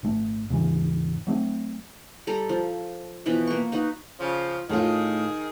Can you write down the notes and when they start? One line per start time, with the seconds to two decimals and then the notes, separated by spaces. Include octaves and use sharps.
0.03 G#1 A3
0.50 D#2 G#2 C#3 E3
1.27 F#3 A3 A#3 C4
2.27 G3 A4 A#5 B5
2.49 F3
3.26 B2 E3 F3 B4
3.47 A#3 C#6
3.72 D#4 F#4 B4
4.20 C#3 F3
4.69 A2 D#3 F4 G#4